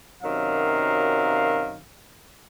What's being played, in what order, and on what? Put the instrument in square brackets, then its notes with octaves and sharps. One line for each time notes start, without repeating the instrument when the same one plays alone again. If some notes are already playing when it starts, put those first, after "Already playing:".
[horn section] F#2 C3 D#3 F#3 F5